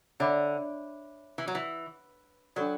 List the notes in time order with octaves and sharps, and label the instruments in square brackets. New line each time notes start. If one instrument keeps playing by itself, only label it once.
[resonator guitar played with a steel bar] D3 [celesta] C#5 E5 B5 D6
[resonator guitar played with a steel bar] E3
F#3
E3
[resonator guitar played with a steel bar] F#3 [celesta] D4 F#4 A4 D5